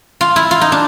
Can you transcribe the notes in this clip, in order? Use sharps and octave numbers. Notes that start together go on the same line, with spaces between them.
F4
E4
F4
D#4
D4